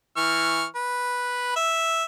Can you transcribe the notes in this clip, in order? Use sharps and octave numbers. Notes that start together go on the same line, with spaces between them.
E3 C#6 F6
B4
E5